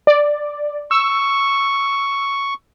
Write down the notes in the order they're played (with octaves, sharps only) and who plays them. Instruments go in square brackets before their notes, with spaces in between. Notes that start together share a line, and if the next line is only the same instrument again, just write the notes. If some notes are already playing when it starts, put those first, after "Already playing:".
[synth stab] D5
[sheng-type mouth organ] C#6 [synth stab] E6